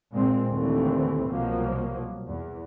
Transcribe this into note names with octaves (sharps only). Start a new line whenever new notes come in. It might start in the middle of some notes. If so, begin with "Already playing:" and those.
A#2 G#3 C4
D#2 D3 E3 A3 C4
C2 B2 F3 F#3 A#3
E2